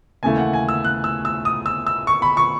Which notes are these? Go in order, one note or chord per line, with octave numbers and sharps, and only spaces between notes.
D#2 C#3 E3 A3 G#5
F#5
G#5
E6
F#6
E6
E6
D#6
E6
E6
C#6
B5
C#6